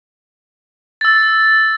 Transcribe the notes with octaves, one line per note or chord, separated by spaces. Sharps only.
E6 A6